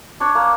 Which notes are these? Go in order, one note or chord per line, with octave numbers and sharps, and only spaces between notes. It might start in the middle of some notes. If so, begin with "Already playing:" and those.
D4 C#5
A#3